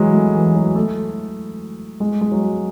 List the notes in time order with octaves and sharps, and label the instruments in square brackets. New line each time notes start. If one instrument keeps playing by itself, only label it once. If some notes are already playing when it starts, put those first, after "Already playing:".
Already playing: [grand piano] E3 F#3 G#3
A3
E3
F#3
A3
G#3
G#3
F#3